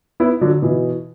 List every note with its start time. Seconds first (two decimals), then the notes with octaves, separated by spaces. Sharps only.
0.20 B3 E4
0.41 D3 F#3
0.62 B2 E3